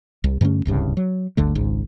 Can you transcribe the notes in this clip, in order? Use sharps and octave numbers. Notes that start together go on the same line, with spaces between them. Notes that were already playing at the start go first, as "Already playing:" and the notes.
C2
G2 D3 A3 C#4
D1 C2 G2 C#3
F#3
G1 D2 D3 A3
G#1 C#2 G#2